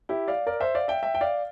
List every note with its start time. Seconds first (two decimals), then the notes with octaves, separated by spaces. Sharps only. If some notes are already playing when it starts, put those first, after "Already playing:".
0.09 E4 G4
0.28 D5 F5
0.46 A#4 D5
0.60 C5 E5
0.75 D5 F5
0.88 E5 G5
1.03 E5 G5
1.15 G5
1.21 D5 F5